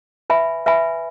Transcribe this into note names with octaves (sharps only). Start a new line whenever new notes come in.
B4 E5 G#5 B5
B4 E5 G#5 B5